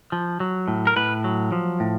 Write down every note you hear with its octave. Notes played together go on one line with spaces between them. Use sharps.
F3
F#3
A2
A#4
A2 B4
F#3
F3
A2